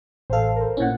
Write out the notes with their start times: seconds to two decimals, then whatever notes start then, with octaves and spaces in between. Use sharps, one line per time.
0.30 A1 A4 C5 F5
0.56 A#4 C5
0.77 A#2 C#4 E4 F#5